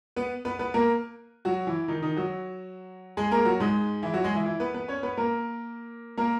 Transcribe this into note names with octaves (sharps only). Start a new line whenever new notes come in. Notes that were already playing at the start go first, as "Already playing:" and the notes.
B3 B4
B3 B4
B3 B4
A#3 A#4
F#3 F#4
E3 E4
D#3 D#4
D#3 D#4
F#3 F#4
G#3 G#4
A#3 A#4
F#3 F#4
G#2 G#3
E3 E4
F#3 F#4
G#3 G#4
E3 E4
E3 E4
B3 B4
B3 B4
C#4 C#5
B3 B4
A#3 A#4
A#3 A#4